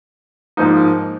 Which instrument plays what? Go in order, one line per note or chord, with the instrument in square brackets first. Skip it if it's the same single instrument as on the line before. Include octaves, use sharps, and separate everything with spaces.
[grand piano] G#2 F3 A#3 D#4